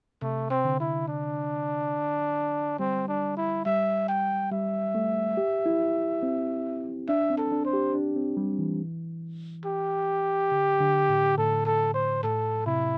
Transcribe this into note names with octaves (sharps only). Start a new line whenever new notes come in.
C3 A3
C4
D3
E4
D4
G3 C4
D4
E4
G3 E5
G5
G3 E5
A3
G4
E4
C4
D4 E5
C4
A4
D4
C5
G4
D4
C4
G3
E3
G4
D3
D3
A2
A2 A4
A4
C5
A2 A4
C3 E4